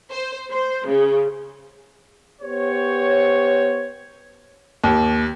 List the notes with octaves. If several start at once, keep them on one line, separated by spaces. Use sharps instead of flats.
C5
C5
C#3
B3 G4 C5 C#5
D#2